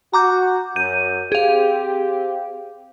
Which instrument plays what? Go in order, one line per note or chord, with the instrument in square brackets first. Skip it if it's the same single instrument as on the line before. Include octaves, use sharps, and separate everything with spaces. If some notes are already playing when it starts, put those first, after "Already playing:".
[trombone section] F#4 [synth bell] A#5 D6 G6
[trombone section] F#2 [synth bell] G6 D#7
[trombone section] C4 G4 [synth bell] G#4 F5